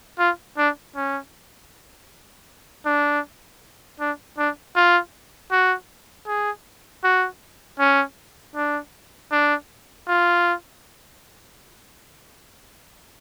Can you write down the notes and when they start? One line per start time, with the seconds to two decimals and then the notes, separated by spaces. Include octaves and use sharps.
0.19 F4
0.57 D4
0.96 C#4
2.85 D4
4.00 D4
4.38 D4
4.76 F4
5.51 F#4
6.28 G#4
7.04 F#4
7.79 C#4
8.55 D4
9.31 D4
10.08 F4